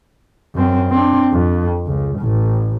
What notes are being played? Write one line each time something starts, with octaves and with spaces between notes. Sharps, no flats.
F#2 C4
C4 D4
F2
C#2
A1 A2